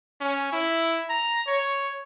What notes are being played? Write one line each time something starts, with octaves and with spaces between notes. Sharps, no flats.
C#4
E4
A#5
C#5